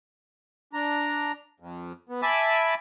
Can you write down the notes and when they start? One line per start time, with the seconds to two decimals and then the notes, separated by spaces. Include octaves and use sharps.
0.73 D4 A#5
1.60 F2
2.09 B3
2.22 E5 G#5 A5 B5 D6